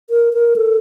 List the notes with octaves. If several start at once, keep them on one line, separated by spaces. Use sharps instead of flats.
A#4
A#4
A4